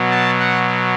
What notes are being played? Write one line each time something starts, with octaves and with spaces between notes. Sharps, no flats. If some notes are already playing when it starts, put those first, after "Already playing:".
Already playing: B2 F#3
A5
F#5